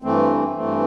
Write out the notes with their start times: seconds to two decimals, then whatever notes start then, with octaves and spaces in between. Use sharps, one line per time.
0.02 G2 E3 A3 C4
0.55 G2 E3 A3 C4